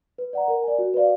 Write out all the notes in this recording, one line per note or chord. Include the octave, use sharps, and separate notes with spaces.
B4
D5 F#5 A#5
A#4
D5 G#5
F#4
B4 D5 F5